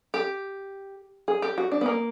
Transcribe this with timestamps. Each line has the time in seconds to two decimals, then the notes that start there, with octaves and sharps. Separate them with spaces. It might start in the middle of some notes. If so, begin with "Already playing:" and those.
0.14 G4
1.28 G#4
1.42 G4
1.58 F#4
1.72 D4
1.81 B3
1.86 A#3